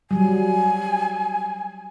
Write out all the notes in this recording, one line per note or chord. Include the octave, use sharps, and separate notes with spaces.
F#3 G3 G#5